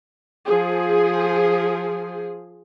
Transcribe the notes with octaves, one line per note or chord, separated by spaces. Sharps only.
F3 G#4